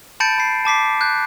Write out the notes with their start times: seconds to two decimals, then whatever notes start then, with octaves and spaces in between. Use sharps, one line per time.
0.20 A5 B5 G6 A6 C#7 D7
0.38 B5 C7
0.65 A5 D6 B6 C7
1.01 F#6 G6